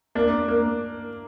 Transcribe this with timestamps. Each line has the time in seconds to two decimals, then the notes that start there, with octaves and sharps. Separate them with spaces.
0.15 A#3 D4
0.48 A#3